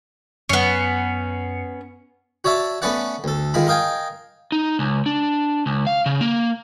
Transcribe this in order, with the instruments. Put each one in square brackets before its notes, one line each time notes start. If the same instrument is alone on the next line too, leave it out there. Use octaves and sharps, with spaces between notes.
[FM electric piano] F#2 C7 C#7 [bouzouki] B3 C#4
[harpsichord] F#4 C#5 D5 E5 A5
A3 B3 C#4 B4 D5 F#5
D2 A4
D#3 G#3 F4 B5
A#4 D#5 F5 G5 G#5
[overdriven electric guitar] D#4
C#2
D4
C#2
F5
C#3
A#3